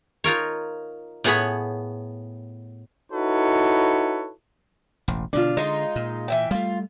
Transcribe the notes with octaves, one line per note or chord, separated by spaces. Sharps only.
D#4 F4 A#4 C#5
A2 B3 G#4 C#5 F#5 B5
D#4 E4 F#4 A4 B4 C#5
E1 A1
B2 D3 D4 F4
D3 G#3 D#4 F4 D#5
A#2
E3 E5 G5
G3 A3 F4